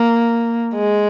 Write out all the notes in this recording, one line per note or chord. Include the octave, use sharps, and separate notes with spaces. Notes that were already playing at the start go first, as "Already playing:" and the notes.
Already playing: A#3
G#3